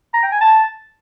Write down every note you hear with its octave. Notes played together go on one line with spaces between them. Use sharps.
A#5
G5
G#5
A5